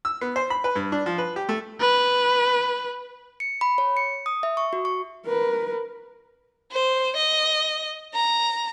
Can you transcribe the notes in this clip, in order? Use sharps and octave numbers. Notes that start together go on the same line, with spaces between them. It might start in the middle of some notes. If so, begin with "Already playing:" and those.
E6
B3
C5
B5
B4
G2
D4
F3
B4
G4
A3
B4
C#7
B5
C#5
C#7
D#6
E5
C#6
F#4
C#6
A#4 B4
C5
D#5
A#5